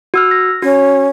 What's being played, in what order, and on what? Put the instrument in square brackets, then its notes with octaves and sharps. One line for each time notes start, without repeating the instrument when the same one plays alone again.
[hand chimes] F#4 E6 F6
A#6
[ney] C#4 [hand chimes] F#4